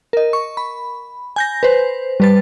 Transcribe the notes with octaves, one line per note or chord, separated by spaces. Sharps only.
A#4 D#5
C#6
B5
G#5 G6 A#6
B4 C5
G3 B4 A6